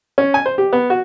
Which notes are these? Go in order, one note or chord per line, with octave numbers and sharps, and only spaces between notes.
C#4
G#5
C5
G4
B3
F#4